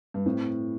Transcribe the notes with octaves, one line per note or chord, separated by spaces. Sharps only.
G2
A2 C4